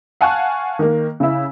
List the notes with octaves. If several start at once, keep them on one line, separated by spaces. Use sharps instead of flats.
F5 F#5 G#5 A5 C#6 F#6
D#3 A#3
C#3 E4